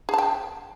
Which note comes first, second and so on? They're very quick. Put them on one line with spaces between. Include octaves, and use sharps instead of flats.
G#4 A5 G5